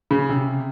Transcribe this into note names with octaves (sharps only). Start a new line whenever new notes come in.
C#3
C3